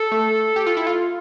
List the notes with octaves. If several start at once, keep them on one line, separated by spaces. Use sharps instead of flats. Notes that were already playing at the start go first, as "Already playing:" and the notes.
Already playing: A4
A3
G4
F4
E4
F4